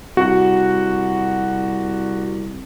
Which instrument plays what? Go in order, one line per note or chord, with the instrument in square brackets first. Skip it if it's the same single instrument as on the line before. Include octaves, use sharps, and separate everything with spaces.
[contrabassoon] C2 [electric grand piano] F#4 F#5